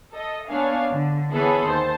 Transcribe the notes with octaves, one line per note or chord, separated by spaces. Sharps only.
A4 D#5
B3 D4 C#5 F5 G#5
D3
E3 B3 G#4 A4 B4 C#5
D#2 C5 A5